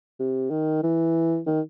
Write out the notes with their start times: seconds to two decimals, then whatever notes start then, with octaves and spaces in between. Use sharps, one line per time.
0.20 C3
0.50 D#3
0.83 E3
1.46 D#3